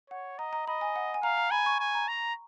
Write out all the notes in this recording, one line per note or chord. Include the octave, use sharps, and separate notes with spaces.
C#5 F#5
D#5 A#5
A#5
D#5 B5
G#5
F#5
G#5
F5 A#5
A#5
G#5 B5
C#6
G#5
A#5
A#5